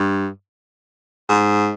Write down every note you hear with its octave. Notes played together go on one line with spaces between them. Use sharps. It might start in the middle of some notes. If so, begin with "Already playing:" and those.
Already playing: G2
G#2